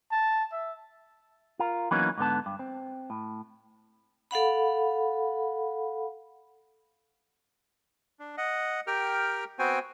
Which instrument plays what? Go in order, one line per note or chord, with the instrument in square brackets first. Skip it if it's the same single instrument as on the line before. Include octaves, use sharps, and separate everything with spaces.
[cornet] A5
E5
[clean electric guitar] F4 A#4
E3 F#3 A#3 B3 C#4 D#4
G#2 D3 B3 A5
G2
C4
A2
[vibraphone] A4 F5 F#5 B5
[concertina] D4
D#5 F#5
G4 A#4 G5 F6
B3 C4 F#4 C5 G5 G#5